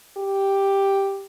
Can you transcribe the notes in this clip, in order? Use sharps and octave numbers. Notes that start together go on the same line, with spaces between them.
G4